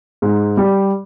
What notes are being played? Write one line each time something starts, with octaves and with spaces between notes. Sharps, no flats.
G#2
G3